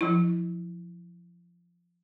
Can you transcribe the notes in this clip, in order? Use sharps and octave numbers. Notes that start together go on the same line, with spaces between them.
F3 F#3 E4